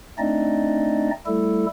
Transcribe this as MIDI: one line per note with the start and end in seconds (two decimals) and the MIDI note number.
0.18 1.10 57
0.18 1.10 60
0.18 1.10 62
0.18 1.10 63
0.18 1.10 74
0.18 1.10 75
1.26 1.66 55
1.26 1.66 57
1.26 1.66 64
1.26 1.66 69